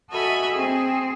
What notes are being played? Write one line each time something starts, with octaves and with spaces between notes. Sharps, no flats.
F#4 A4 D#5 E5 G#5 B5
C4 G#4